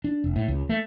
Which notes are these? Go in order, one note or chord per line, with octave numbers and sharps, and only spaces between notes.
D4
F1
A2
C#2
A3